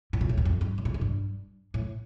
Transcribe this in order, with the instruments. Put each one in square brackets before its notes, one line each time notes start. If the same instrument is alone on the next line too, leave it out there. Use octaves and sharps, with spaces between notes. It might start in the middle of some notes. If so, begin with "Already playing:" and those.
[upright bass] A2
A#2
A2
E2
F2
G2
A2
A#2
A2
G2
A2